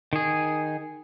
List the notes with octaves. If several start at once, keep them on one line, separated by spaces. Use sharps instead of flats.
D#3 G#4